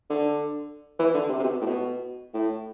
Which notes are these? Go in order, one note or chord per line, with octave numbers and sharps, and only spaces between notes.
D3
E3
D3
C3
C3
B2
A2
B2
A2